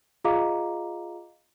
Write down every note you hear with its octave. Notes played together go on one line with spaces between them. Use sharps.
F4 G#4 D#5 F5 A#5 D6